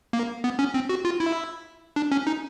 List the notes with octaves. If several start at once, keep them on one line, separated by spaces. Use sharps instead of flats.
A#3
B3
C#4
C4
F#4
F4
E4
D4
C#4
D#4